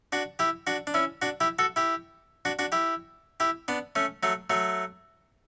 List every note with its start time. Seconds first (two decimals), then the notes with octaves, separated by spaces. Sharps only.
0.12 D4 F#4
0.39 E4 G4
0.67 D4 F#4
0.87 D4
0.94 C#4 E4
1.22 D4 F#4
1.41 E4 G4
1.59 F#4 A4
1.76 E4 G4
2.45 D4 F#4
2.59 D4 F#4
2.72 E4 G4
3.40 E4 G4
3.68 B3 D4
3.95 A3 C#4
4.23 F#3 A3
4.50 F#3 A3